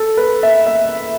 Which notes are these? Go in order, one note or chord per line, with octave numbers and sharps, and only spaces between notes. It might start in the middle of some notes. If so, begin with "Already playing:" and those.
Already playing: A4
B4
E5
E5